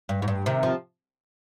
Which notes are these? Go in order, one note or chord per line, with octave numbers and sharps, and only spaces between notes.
G2
G#2
G2
C3 D#3
F3